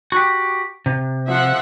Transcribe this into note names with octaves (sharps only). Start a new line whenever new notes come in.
F#4 G4
C3
F3 E5 F#5